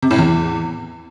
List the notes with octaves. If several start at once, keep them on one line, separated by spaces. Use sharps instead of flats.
C3
A2
E2